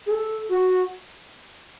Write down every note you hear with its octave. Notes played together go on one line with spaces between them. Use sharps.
G#4
A4
F#4